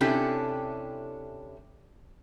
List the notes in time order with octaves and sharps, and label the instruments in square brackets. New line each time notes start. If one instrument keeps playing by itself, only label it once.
[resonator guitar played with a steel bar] C3 C#4 D4 E4 G4 A4